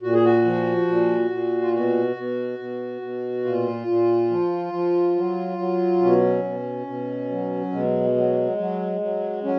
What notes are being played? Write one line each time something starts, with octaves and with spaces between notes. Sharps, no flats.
A#2 F#4
G#4
F#4
F3
A#2
A#2
F4
B2 F#4
B2
B2
B2
A#2 F4
A#2
F3
F3
F#3
F#3
B2 C#4
B2
B2
F#3
B2 G#3
F#3
F#3
F#3
F#3 C#4